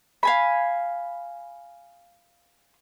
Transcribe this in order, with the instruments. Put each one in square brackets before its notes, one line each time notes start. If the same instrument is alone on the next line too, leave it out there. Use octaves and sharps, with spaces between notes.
[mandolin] F5 G#5 B5